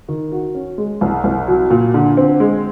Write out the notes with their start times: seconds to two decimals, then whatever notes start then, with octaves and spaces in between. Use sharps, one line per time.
0.09 D#3
0.32 F#4
0.55 C#4
0.78 G#3
1.01 C2
1.24 C2
1.47 F#3
1.70 A#2
1.94 D3
2.17 C4
2.40 G#3